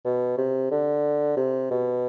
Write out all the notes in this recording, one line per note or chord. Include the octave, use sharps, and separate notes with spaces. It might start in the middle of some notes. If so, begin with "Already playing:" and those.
B2
C3
D3
C3
B2